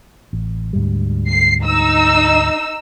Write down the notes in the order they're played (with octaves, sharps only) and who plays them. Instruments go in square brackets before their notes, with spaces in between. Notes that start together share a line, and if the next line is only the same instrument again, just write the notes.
[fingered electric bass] A1
D2 G#2 G3
[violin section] C7
D#4 E6